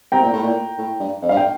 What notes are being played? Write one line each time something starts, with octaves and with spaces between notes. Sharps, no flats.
C3 G5 A#5
A#2
A2
A#2
A2
G2
F2
G2 F5
G5